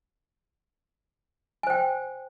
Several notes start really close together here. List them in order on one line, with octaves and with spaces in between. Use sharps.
G#5 C5 G5